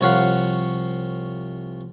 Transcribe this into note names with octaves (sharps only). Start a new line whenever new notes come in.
C2 F3 C#5 F5 F#5 B5